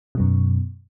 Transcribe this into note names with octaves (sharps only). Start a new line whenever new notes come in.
F#2 B2 F#3